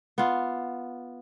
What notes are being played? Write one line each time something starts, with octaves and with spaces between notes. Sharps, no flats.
B3 F4